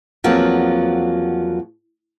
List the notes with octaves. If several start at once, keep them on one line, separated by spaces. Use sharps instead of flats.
E2 F3 F#3 A#3 C4